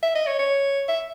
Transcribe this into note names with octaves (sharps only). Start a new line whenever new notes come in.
E5
D#5
C#5
C#5
E5